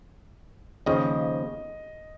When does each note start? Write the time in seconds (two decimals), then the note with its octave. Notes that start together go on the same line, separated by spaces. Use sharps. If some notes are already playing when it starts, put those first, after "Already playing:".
0.86 D#2 C#3 F3 D#5